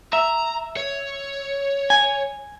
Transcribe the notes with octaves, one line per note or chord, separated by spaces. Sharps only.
E5 A#5
C#5
G#5